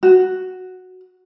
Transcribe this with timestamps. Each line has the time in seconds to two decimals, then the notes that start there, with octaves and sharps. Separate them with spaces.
0.03 F#4